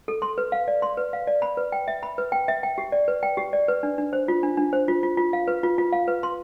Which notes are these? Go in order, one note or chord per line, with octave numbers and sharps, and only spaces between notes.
A4
C6
B4
F5
D5
C6
B4
F5
D5
B5
B4
G5
E5
B5
B4
G5
E5
G5
G4
D5
B4
G5
G4
D5
B4
D4
D4
C5
F4
D4
D4
C5
F4
F4
F4
F5
B4
F4
F4
F5
B4
C6